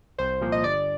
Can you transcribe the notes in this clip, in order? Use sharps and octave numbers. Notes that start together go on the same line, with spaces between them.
C2 C5
A#2 F3 A#3
D#5
G1 D5